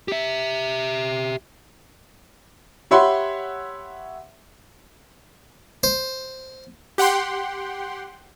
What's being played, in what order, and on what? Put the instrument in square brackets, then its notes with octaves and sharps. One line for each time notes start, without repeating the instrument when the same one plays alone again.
[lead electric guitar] G4 E5
[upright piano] G4 C#5 E5 F#5 B5 C6
[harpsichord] C5
[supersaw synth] G4 F#5 G5 C6